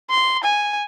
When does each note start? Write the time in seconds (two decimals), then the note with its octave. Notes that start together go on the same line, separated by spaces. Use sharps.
0.10 C6
0.44 G#5